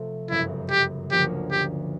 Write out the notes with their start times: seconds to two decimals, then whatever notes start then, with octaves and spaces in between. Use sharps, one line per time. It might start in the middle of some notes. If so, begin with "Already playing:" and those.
Already playing: C3 F3 A3 C4
0.30 G1 F#2 C#3 E4
0.71 G4
1.11 D2 D3 F3 A#3 C#4 G4
1.51 G4